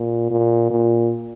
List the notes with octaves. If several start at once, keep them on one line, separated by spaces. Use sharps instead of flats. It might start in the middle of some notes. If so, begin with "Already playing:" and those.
Already playing: A#2
A#2
A#2